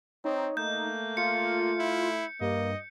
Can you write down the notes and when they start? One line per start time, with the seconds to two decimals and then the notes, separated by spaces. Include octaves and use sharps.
0.25 C4 D#4 C#5
0.57 A3 A#3 G6
1.17 F4 C#7
1.79 E4
2.41 G2 A#3 D#5